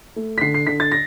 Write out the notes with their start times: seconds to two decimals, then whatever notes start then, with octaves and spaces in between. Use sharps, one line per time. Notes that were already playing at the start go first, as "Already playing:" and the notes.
0.16 A3
0.38 B6
0.41 D3 C7
0.54 C7
0.67 D3 B6
0.80 A6
0.92 A#6